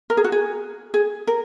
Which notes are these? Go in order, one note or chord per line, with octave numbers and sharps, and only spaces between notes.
A#4
G#4
F#4
G#4
G#4
A#4